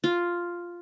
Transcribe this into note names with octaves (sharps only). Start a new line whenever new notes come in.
F4